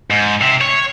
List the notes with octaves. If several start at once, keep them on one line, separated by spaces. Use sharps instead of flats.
G#2
C3
C#5